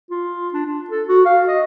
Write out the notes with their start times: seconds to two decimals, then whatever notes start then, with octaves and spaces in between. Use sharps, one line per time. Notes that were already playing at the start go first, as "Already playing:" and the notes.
0.10 F4
0.53 D4
0.66 D4
0.90 A4
1.08 F#4
1.25 F5
1.48 D#5